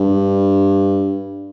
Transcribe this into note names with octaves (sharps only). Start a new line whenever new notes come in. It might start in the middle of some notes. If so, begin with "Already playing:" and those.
Already playing: G2